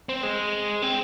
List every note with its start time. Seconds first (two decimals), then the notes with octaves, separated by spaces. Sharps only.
0.09 C4
0.23 G#3
0.82 C4